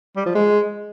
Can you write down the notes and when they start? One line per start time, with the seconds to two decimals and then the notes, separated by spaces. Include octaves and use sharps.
0.16 G3
0.26 F3
0.35 G#3